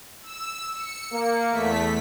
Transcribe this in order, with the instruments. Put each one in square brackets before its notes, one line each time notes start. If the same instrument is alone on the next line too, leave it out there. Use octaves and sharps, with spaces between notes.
[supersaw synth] E6
C#7
[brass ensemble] A#3
[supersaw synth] E2 A3 B6